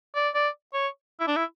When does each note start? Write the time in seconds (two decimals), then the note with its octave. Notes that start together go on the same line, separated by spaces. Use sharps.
0.15 D5
0.34 D5
0.74 C#5
1.20 E4
1.28 D4
1.36 E4